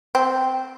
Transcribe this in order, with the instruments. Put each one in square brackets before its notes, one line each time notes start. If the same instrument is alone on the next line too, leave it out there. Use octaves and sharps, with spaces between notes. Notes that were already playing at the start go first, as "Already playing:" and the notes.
[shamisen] C4